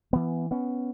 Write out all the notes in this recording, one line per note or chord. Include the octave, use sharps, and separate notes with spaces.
E3 B3
B3 C#4